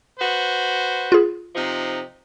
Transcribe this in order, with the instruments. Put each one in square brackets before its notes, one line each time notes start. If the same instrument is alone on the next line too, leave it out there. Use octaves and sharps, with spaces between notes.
[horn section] F#4 B4 C5
[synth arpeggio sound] F4 G#4
[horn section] C3 F3 D#4